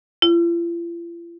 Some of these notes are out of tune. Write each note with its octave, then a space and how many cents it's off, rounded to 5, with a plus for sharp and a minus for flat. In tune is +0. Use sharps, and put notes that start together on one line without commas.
F4 -45